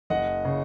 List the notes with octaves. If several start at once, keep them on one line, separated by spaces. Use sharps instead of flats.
F#1 D#5 F#5
C#3